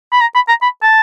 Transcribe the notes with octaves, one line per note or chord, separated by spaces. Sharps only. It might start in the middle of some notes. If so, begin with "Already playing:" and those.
B5
A#5
B5
A#5
B5
A5